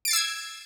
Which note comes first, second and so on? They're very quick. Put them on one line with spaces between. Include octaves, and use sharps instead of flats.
D7 A6 C7 E6 G#6